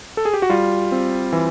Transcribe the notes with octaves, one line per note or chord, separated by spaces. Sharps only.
A4
G#4
G4
F#4
G3 F4
C4
E3